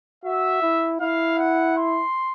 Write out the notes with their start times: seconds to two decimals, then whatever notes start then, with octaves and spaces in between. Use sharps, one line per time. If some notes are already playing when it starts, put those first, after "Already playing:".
0.24 F#4 E5
0.62 E4
1.00 E4 F5
1.39 F#5
1.77 C6